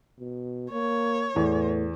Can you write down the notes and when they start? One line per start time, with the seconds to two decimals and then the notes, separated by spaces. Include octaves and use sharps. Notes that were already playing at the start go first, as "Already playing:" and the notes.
0.19 B2
0.71 A#3 C#5
1.36 E2 A2 E3